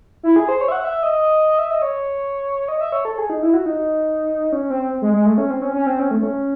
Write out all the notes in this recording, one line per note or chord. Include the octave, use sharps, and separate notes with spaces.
E4
G#4
C5
C#5
E5
F#5
E5
D#5
E5
D#5
C#5
D#5
E5
C#5
A4
G#4
D#4
E4
F#4
D#4
C#4
C4
G#3
G#3
A3
C#4
C4
C#4
C#4
C4
C#4
A3
C#4